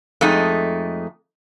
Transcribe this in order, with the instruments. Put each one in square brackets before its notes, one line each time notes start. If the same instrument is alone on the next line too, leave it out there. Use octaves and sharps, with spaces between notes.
[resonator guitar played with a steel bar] F2 G#3 A3 D#4